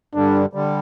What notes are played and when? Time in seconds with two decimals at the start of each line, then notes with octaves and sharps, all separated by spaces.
0.15 G2 D3 G3 D4
0.53 D3 G3